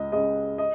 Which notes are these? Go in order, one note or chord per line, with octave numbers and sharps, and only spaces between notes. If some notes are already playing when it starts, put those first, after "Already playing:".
Already playing: C#2 D#5
C#3 G#3 D#5
D#5